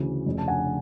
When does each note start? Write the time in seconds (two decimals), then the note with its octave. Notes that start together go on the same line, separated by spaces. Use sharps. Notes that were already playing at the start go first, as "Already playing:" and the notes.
Already playing: D2 C#3 E3
0.25 F1 F2 C#3
0.38 A5
0.48 F#5 G#5